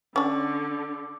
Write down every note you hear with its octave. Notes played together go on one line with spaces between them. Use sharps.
D3 C#4 D4 D6